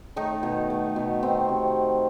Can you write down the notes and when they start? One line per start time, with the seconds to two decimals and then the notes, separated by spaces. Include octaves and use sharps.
0.16 D#3 A3 D#4
0.43 B2
0.70 A3
0.96 B2
1.23 D#3 C4
1.49 C3